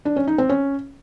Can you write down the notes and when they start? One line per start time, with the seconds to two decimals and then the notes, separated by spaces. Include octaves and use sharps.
0.05 D4
0.16 C#4
0.27 D#4
0.38 C4
0.49 C#4